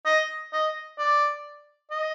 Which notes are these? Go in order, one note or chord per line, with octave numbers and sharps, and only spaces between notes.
D#5
D#5
D5
D#5